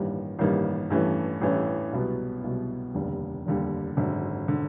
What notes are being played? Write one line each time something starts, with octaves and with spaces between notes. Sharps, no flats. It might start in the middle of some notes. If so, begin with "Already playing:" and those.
Already playing: A1 G2 D#3 G3 A#3
A1 G2 D#3 G3 A#3
A1 G2 E3 A3 C#4
A1 G2 E3 A3 C#4
C2 B2 F#3 B3
C2 B2 F#3 B3
F1 D#2 D3 G3
F1 D#2 D3 G3
G#1 F#2 D3
D3